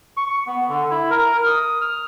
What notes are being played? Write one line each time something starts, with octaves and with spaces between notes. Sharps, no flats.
C#6
B3
D3
E4
A#4
D#6
F6